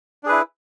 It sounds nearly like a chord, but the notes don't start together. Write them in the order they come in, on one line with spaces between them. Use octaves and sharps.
D4 G#4 B4 E4